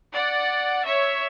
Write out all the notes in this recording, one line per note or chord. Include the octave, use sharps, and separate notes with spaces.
D5 F#5
C#5 E5